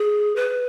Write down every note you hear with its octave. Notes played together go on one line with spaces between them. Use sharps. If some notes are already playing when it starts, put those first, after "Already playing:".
Already playing: G#4
B4